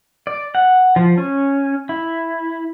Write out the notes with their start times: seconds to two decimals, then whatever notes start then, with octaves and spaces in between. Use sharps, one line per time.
0.27 D5
0.55 F#5
0.96 F3
1.18 C#4
1.89 E4